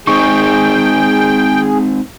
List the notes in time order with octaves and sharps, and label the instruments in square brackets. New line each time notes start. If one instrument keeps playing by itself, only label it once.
[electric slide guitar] G#3 C4 D#4 [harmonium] G#4 [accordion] G5 [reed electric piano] C#6